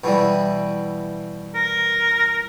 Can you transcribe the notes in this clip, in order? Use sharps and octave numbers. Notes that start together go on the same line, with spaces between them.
B2 E3 G3
A#4